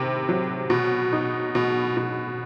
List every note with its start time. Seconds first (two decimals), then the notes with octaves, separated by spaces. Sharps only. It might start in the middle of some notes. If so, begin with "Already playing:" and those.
Already playing: C3 D#3
0.29 F#3
0.70 B2
1.13 D#4
1.55 B2
1.97 B2